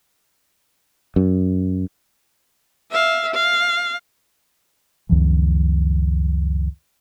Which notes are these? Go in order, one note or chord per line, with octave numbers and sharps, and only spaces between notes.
F#2
E5 F5
F5
C#2 F#2 D#3 F3